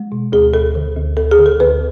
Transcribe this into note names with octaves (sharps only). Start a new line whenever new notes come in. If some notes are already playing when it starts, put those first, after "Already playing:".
Already playing: G#3
B2
D2 G#4
D2 A4
D3
D2
D2 A4
G#4
D3
A4
D2 B4